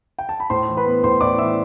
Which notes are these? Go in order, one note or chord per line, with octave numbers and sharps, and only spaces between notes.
G5
A5
B5
A2 C5 C6
E3
B4 B5
B3
A2 C5 C6
A2 D5 D6
E3 E5 E6